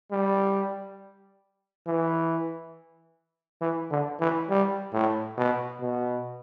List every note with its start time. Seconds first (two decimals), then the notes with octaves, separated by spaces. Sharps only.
0.11 G3
1.87 E3
3.61 E3
3.91 D3
4.20 E3
4.49 G3
4.93 A2
5.37 B2
5.81 B2